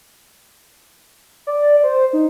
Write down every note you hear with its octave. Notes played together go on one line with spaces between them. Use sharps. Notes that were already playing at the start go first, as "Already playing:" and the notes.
D5
C5
D#4